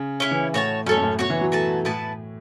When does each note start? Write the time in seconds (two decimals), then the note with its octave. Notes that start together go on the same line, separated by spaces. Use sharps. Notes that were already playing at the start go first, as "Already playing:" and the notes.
Already playing: C#3
0.20 C#3 C#4 E4 C#5
0.31 E3
0.53 A2 F#4 C#5 A5
0.86 F#2 C#4 A4 C#5
0.97 F#2
1.03 A2
1.19 B2 F#4 C#5 F#5
1.30 E3
1.41 F#3
1.52 A3 F#4 B4 A5
1.85 A2 B3 E4 B4 A5